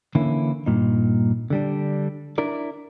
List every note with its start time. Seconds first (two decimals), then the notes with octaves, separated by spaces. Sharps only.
0.15 D3 E3 A#3 C#4 E4
0.66 G2 A#2 D#4
1.50 D3 G3 D4
2.38 D4 E4 A#4 D5